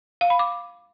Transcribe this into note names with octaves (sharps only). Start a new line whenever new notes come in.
F5
B5
D6